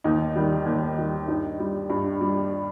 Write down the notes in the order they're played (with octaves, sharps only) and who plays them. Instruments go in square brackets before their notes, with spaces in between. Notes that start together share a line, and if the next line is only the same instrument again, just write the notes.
[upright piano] D#2 D#4
D#3 G3
D#2
D#3 G3
G2 D#4
G3
G2
G3